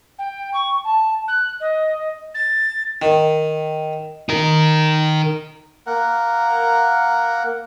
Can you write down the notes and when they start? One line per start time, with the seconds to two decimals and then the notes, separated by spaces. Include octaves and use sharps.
0.18 G5
0.53 C#6
0.84 A5
1.28 F#6
1.60 D#5
2.34 A6
3.02 D#3
4.29 D#4 A#4
5.87 A#3 A#4 F#5